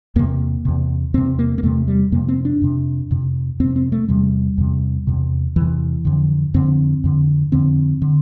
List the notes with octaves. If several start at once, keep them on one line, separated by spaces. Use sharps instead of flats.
E2 C3 A#3
E2 C3
E2 C3 C4
A#3
A#3
E2 C3 A3
G3
F2 C3 A#3
C4
D4
F2 C3
F2 C3
F2 C3 C4
C4
A3
E2 C3 G3
E2 C3
E2 C3
E2 C3 E3
F2 D3
F2 D3 C4
F2 D3
F2 D3 C4
D3